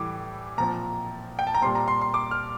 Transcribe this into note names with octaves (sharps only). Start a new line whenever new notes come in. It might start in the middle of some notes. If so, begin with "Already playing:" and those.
Already playing: A2 E3 G3 D6
A#2 F3 C4 A#5
G5
A5
A#5
A#2 G3 C4 C6
A#5
C6
C6
D6
F6